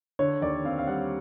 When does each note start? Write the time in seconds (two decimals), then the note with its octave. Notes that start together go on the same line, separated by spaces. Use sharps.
0.19 D3 C#5
0.41 D#2 D5
0.65 C4 F5
0.78 F5
0.87 G3 F#5